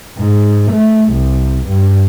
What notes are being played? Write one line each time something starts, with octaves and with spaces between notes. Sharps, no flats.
G#2
A3
C2
G2